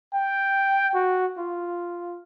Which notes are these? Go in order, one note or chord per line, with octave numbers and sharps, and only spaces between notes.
G5
F#4
F4